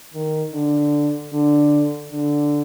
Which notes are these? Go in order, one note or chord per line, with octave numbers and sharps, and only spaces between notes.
D#3
D3
D3
D3